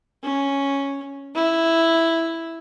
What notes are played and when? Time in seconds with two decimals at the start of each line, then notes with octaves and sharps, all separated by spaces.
0.24 C#4
1.35 E4